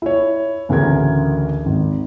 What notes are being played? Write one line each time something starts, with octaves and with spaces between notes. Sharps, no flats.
E4 C#5
A1 D2 C#3 A#4 G#6
G#1